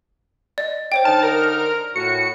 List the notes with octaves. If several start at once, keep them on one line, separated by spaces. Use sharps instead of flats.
D5 D#5
C5 C#5 G5
D3 D#4 A5 F6
A#4
A2 F#4 C#7